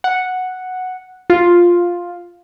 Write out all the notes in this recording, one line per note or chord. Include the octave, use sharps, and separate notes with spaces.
F#5
F4